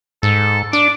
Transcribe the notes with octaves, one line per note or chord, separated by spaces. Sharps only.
G#2 A4
D4 D6